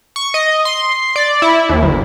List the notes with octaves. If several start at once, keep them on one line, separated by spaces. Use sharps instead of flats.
C#6
D#5
C6
D5
E4
D#2
G1